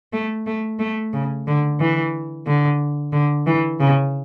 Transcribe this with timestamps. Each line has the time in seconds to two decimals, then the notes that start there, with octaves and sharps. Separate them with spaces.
0.13 A3
0.47 A3
0.79 A3
1.13 C#3
1.47 D3
1.80 E3
2.47 D3
3.13 D3
3.46 E3
3.80 C#3